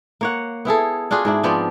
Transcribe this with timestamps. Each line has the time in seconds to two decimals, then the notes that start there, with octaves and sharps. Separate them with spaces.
0.21 A#3 C#5 F#5
0.65 B3 E4 G#4 A4
1.11 D4 F4 F#4 G#4
1.25 G#2 D4 E4
1.43 F3 B3 C4 D5